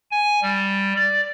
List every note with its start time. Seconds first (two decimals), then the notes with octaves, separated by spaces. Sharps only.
0.11 G#5
0.42 G3
0.96 D5